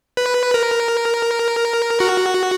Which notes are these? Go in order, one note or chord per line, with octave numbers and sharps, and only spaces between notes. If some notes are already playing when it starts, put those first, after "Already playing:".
B4
A#4
F#4